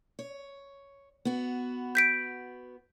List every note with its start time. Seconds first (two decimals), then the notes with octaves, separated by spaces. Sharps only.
0.19 C#5
1.25 B3 F#4
1.95 G6 B6 D7